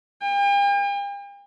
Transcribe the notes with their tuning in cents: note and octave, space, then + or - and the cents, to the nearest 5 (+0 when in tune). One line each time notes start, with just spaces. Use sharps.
G5 +45